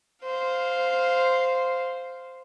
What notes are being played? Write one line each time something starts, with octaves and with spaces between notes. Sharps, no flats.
C5 F5